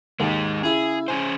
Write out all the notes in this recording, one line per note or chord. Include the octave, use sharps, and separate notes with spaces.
D#2 G#3 D#4
C#3 E4 G#4
C#4 G#4 C5 G#5